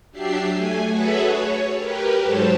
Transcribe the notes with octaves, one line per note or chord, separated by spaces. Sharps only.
F#3 D4 G4 E5 C7
A3 G#5
F#4 G#4 A4 B4 C#5 E5
C#5
G4 A#4 B4
G#2 F#3 A4 C5 C#5 A5